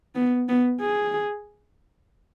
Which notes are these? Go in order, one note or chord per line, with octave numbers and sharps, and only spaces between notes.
B3
B3
G#4